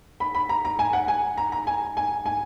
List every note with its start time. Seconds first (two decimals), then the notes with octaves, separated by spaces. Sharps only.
0.20 B5
0.35 B5
0.49 A#5
0.65 A#5
0.79 G#5
0.93 F#5
1.08 G#5
1.38 A#5
1.52 A#5
1.67 G#5
1.97 G#5
2.26 G#5